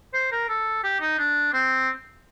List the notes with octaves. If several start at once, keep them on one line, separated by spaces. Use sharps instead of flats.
C5
A#4
A4
G4
D#4
D4
C4